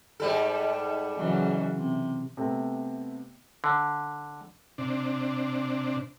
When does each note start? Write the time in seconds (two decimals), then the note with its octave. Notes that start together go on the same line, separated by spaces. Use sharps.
0.20 G#2 G3 A4
1.16 C#3 E3 F#3
1.77 C3
2.37 C3 A3 B3
3.64 D3
4.78 C3 D4